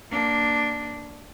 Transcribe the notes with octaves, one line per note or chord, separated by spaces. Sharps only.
A#3 D4